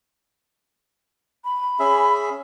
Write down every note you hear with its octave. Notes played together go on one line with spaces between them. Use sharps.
B5
C#4 G#4 E5